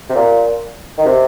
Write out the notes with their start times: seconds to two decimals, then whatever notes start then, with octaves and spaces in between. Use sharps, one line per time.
0.10 C3
0.15 A#2
0.98 D#3
1.06 C3